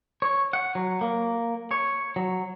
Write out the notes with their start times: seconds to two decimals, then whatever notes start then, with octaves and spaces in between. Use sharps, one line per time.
0.22 C#5
0.53 F#5
0.75 F#3
1.01 A#3
1.71 C#5
2.16 F#3